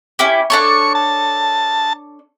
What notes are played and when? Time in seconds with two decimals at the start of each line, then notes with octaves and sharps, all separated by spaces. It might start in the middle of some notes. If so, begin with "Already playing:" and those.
0.19 C#4 E4 G4
0.50 D4 A4 C#5 C#6
0.95 A5